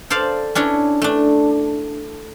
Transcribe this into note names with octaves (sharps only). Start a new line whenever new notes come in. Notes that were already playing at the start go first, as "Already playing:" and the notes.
A4 C5 D5 F5
C#4 D4 E4 C#5
A3 D4